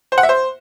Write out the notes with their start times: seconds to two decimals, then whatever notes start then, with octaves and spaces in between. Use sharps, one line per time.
0.12 C5
0.18 F#5
0.23 E5
0.29 C5